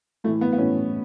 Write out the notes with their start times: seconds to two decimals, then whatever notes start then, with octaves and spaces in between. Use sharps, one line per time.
0.24 A2 A3
0.28 E3
0.41 B3
0.53 B3
0.58 A2 E3 C#4